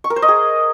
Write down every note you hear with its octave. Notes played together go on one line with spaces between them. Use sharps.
C#6
A#4
C5
D#5
G#4